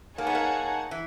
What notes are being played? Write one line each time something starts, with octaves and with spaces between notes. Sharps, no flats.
A#3 D#4 G#4 C#5 F#5 A5
B3
A#3
E3